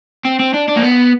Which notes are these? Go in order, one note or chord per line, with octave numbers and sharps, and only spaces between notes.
C4
C4
D4
D4
A#3
B3